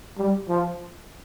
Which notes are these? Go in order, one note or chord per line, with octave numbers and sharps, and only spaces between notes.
G3
F3